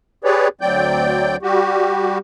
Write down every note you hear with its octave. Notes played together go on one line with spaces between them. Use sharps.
G4 G#4 B4 C#5 D5
D2 F#3 C4 D5 G5 G6
G3 F#4 G4